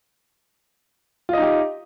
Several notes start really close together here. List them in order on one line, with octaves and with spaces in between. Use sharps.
F4 D#5 D#4 G4